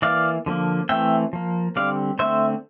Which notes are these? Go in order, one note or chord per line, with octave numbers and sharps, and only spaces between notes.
E3 A#3 D5 F5
D3 F3 A#3
E3 A3 C4 E5 G5
F3 A#3
D3 G3 C4 D5 F5
D3 A3 C4 C5 E5